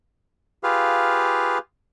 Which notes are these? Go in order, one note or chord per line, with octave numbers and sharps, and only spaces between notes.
F4 G4 G#4 B4 F5